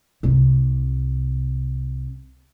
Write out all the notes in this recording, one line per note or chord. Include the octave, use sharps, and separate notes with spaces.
C2 C3